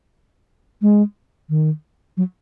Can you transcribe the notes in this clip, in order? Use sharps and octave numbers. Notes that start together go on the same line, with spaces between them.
G#3
D#3
F#3